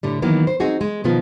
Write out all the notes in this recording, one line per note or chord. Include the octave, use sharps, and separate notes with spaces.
A2 D3 G3
D#3 E3 F#3 A#3 B3
C5
C4 D#4 F#4 G#4
G#3
B2 D#3 F3 B3 F4